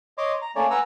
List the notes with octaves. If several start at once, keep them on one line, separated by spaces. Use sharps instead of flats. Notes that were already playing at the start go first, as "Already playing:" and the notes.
C#5 D#5 C6 D6
A#5
A3 A#3 C#4 C#5 D5
B4 F#5 G#5 A#5 E6